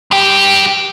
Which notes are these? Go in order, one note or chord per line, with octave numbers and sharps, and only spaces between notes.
G2 G4